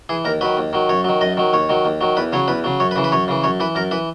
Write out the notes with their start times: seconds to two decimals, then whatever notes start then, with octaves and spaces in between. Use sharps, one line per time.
0.09 E3 G#4
0.25 D#2 A#4
0.41 D#3 F#3 B4
0.57 D#2
0.73 D#3 F#3
0.89 F#2 C#5
1.04 D#3 F#3
1.21 F#2 D#5
1.37 D#3 F#3
1.53 D#2 C#5
1.69 D#3 F#3
1.85 D#2
2.01 D#3 F#3
2.17 E2 B4
2.33 C#3 F#3 C#5
2.48 E2 B4
2.64 C#3 F#3
2.80 F#2 C#5
2.91 B4
2.96 C#3 E3
3.04 B4
3.12 F#2 C#5
3.28 C#3 E3
3.43 F#2 C#5
3.60 E3 B4
3.75 F#2 A#4
3.91 E3 B4